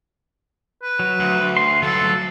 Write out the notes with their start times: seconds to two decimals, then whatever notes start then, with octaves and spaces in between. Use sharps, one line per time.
0.83 B4
0.99 F#3
1.20 D2
1.57 C6
1.82 G2 F#3 A4